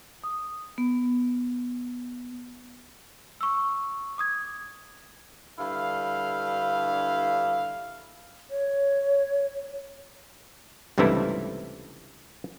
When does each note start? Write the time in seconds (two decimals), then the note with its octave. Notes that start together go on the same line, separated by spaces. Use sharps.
0.24 D#6
0.78 B3
3.41 C#6 E6
4.18 D6 D#6 G#6
5.59 G2 D3 E4 F5
8.50 C#5
10.98 C#2 G2 C3 E3 A3 E4